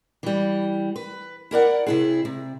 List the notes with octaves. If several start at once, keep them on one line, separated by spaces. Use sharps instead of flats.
E3 G3
B4
E4 A#4 D5 F#5
C3 E4 G#4
C3